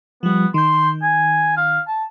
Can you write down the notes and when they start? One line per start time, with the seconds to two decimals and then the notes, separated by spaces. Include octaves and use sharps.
0.23 F3 G3 B3
0.54 D#3 C6 G6
1.02 G#5
1.57 F5
1.88 A5